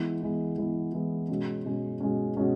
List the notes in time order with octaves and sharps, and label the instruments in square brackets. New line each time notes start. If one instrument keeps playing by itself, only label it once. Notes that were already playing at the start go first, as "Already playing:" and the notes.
Already playing: [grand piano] E3 G#3 B3 E4
E3 G#3 B3 E4
E3 G#3 B3 E4
E3 G#3 B3 E4
B2 G#3 C#4
B2 G#3 C#4
B2 G#3 C#4
B2 G#3 C#4